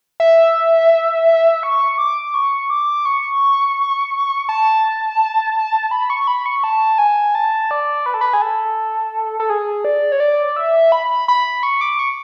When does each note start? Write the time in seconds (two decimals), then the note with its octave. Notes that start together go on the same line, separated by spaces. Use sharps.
0.20 E5
1.63 C#6
1.98 D6
2.34 C#6
2.70 D6
3.05 C#6
4.49 A5
5.91 B5
6.10 C#6
6.27 B5
6.46 C#6
6.64 A5
6.98 G#5
7.35 A5
7.71 D5
8.06 B4
8.14 A4
8.21 B4
8.33 G#4
8.42 A4
9.40 A4
9.50 G#4
9.85 D5
10.12 C#5
10.20 D5
10.56 E5
10.92 B5
11.28 B5
11.63 C#6
11.81 D6
11.99 C#6